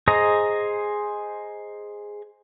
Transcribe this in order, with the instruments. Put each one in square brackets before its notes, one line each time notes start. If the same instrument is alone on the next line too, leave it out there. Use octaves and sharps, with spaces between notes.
[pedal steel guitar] G#4 C5 D#5 A#5